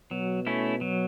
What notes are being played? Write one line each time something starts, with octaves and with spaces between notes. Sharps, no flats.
B2 F#3
A3 C#4 E4
F#3